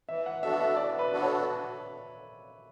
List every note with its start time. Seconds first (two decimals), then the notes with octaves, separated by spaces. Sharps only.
0.09 E3 E5
0.26 F#5
0.43 B3 D4 F#4 A4 E5
0.61 E5
0.76 E3 D5
0.99 B4
1.11 B3 D4 F#4 A4
1.22 C#5